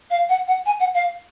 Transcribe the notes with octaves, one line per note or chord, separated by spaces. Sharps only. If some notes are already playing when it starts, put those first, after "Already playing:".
F5
F#5
F#5
G#5
F#5
F5